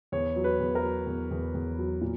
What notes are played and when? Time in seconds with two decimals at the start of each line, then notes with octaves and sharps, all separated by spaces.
0.12 E2 C#5
0.36 F#3
0.44 B4
0.60 E2
0.75 A#4
0.83 F#3
1.07 E2
1.31 E2
1.54 E2
1.78 F#3
2.01 A#2